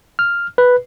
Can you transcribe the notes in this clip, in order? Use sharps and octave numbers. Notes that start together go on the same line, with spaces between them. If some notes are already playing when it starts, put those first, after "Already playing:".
F6
B4